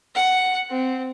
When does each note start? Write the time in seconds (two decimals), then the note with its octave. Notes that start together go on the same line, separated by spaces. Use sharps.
0.15 F#5
0.70 C4